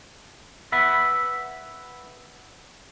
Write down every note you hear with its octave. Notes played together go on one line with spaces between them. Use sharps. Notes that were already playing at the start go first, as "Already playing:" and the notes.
B4 E5 F#5 B5